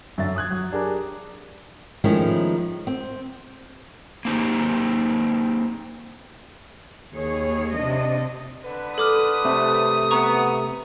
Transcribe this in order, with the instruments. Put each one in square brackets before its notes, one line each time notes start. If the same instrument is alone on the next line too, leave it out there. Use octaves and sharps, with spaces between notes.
[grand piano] F#2 D3 E5 A6
D#6 F#6 G#6
F#3
D4 G4 G#4 A#4 G#5 A#5
[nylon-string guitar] D#3 F3 G#3 A3 C#4 E4
C4
[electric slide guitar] A#3 C4 D#4 G4
[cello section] D#2 G#4 C#5
C3 D4 D#5
[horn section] D3 B4
[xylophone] A4 D6 F6 [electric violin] D#6
[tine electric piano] C3 A3
[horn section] B3 [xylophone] A#5 C#6